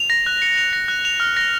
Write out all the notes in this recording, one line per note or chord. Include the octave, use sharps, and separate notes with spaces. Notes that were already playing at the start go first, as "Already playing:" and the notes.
Already playing: F7
A#6
F#6
C#7
F7
A#6
F#6
F7
F6
A#6